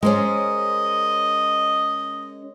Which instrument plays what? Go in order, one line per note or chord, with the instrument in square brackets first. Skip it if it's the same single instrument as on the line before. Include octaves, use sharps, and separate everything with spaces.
[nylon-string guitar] G#3 C5 D5 [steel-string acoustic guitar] C#4 A#4 [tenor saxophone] D#5